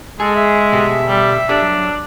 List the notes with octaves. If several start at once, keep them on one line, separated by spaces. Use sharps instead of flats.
G#3 G#4 A4
E5
B2 G4 A4
G3
D4 G4 A4 D5
F#3